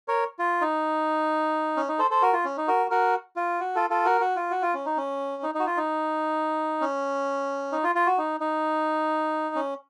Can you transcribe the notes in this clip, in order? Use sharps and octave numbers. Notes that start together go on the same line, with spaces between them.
A#4 C#5
F4
D#4
C#4
D#4
A4 C5
A4 C5
F#4 A#4
F4
C#4
D#4
F#4 A#4
F#4 A#4
F4
F#4
F4 A4
F4 A4
F#4 A#4
F#4
F4
F#4
F4
C#4
D#4
C#4
D#4
D#4
F#4
F4
D#4
C#4
D#4
F4
F4
F#4
D#4
D#4
C#4